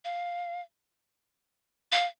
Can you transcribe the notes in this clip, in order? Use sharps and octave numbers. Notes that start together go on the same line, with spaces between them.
F5
F5